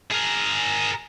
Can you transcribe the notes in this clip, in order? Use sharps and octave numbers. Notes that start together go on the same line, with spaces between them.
G#4 A#4